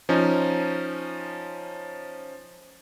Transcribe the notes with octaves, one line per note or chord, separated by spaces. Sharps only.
F3 C#4 D#4